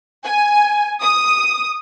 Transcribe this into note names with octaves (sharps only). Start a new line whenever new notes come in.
G#5
D#6